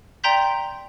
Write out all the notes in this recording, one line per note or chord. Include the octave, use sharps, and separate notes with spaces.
D5 G5 A#5 C6 G6 B6